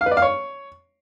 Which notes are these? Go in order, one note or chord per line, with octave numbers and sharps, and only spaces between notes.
F5
B4
D5
F5
C#5